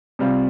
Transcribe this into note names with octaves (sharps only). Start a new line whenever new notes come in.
C3 G3 C4 F4